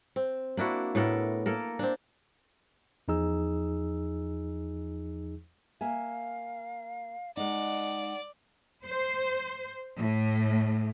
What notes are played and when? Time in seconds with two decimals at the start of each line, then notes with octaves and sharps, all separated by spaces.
0.16 C4
0.57 A#3 D4 E4 F#4
0.95 A2 B3 A4 A#4
1.46 A#3 A4 A#4
1.79 C4 D4
3.08 E2 F3 D#4 G#4 E6
5.81 A#3 E5 F5 G#5
7.37 G#3 D#4 D5 F#5
8.85 C5
10.00 A2